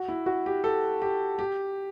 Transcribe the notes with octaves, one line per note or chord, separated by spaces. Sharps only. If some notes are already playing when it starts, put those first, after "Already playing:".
Already playing: F#4
E4
F#4
G4
A4
G4
G4